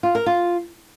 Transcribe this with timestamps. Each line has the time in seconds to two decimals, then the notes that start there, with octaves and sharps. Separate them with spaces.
0.03 F4
0.15 A#4
0.26 F4